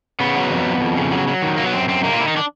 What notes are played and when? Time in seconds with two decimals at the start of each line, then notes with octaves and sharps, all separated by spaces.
0.20 C#3 B3
0.36 F#3
0.51 F2
0.65 F2
0.81 F2
0.96 C#3
1.12 F#3
1.28 F#3
1.42 D#3
1.58 F#3 A#3
1.66 B3
1.73 F#2 C4
1.88 F#2 C4
2.04 D#3 A#3
2.13 F4
2.19 D#3 E4
2.28 D#4
2.37 D4